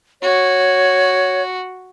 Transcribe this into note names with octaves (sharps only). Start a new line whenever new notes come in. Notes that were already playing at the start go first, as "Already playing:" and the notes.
F#4 C#5